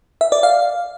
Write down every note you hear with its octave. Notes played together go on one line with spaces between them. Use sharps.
E5
D5
F5